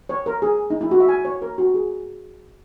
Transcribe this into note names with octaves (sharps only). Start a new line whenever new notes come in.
C#5
A#4
G#4
D#4
E4
F#4
E5
G#5
C#5
A#4
F#4
G#4